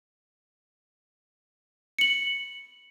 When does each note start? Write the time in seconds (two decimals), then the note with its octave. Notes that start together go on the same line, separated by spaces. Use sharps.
1.99 C#7 F#7